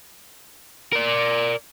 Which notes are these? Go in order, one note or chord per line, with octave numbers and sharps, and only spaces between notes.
A#4 D5